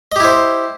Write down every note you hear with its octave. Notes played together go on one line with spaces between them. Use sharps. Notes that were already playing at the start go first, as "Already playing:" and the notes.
E4 G4 C5 D#5